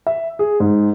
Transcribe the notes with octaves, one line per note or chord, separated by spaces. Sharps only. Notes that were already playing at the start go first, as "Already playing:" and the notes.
E5
G#4
G#2